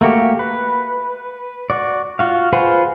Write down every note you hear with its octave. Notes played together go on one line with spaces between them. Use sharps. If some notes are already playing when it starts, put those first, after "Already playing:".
A3 A#3 F#4 G4
B4
F#4 D5
F4 F#4 F5
F4 G#4 B4 C5 F#5